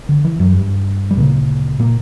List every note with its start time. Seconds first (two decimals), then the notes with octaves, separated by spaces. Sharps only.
0.09 D3
0.25 E3
0.40 F#2 F#3
0.55 G2 G3
1.11 G3
1.17 D2 A#2 C#3 A#3
1.80 A#2 A#3